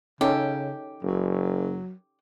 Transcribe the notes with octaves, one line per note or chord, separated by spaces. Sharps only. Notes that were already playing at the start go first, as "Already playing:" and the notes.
C#3 C#4 D#4 G4 A4
F#1 F#3